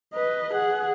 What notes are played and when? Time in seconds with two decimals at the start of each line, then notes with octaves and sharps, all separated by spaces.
0.14 B4 D#5
0.54 G#4 F#5